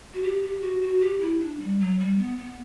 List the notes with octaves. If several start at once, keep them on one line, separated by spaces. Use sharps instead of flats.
F#4
G4
G4
F#4
F#4
G4
E4
D4
G3
F#3
G3
B3
B3